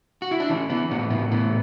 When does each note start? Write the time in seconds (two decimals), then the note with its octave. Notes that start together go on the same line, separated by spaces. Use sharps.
0.22 F#4
0.31 E4
0.40 D4
0.50 E3 C#4
0.70 E3 B3
0.91 A2 B3
1.10 A2 B3
1.32 E3 B3